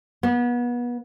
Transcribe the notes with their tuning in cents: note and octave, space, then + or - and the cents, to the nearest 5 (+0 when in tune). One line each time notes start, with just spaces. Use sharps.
B3 -30